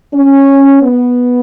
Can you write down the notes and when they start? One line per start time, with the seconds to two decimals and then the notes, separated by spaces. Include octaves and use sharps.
0.14 C#4
0.82 B3